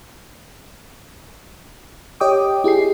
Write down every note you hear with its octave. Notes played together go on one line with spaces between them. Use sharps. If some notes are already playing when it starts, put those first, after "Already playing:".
G4 C#5 D#5 G5 D6 D#6
E4 G4 G#4 C7